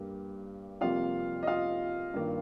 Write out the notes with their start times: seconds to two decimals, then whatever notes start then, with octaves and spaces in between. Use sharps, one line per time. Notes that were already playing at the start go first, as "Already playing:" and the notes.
Already playing: G2 G3 A#3
0.81 F2 C3 G3 A#3 F4 F5
1.43 D#5
1.47 F4 F5
2.14 G2 D#3 A#3